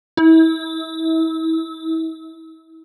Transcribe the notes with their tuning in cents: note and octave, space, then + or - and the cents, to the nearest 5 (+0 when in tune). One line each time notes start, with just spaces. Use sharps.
E4 -35